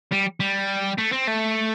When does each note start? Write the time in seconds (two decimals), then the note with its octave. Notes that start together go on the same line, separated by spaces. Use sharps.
0.11 G3
0.40 G3
0.98 A3
1.13 C4
1.28 A3